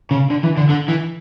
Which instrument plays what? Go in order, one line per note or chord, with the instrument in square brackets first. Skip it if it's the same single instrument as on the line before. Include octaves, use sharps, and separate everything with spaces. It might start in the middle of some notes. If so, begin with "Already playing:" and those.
[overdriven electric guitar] C#3
D3
E3
D3
D3
E3